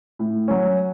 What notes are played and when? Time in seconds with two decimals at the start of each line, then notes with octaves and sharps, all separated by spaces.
0.19 A2
0.48 F#3 C#4